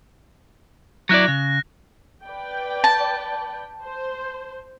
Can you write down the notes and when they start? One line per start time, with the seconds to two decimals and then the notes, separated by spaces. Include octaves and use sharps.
1.09 F#3 E4 D5 F#6 A#6
1.28 C#3
2.24 B4 D5 G5
2.84 A5
3.82 C5